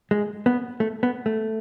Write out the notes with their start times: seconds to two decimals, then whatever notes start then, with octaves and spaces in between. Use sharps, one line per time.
0.11 G#3
0.46 B3
0.80 A3
1.03 B3
1.26 A3